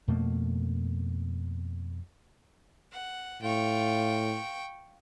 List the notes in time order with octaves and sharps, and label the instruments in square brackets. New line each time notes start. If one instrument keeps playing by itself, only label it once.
[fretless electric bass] F2 B2 A3 A#3
[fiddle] F#5
[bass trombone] A2 [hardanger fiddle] F4 [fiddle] G5 C#6